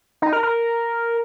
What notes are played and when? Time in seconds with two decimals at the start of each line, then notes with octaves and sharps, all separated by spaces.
0.22 D#4
0.33 A#4
0.43 A#4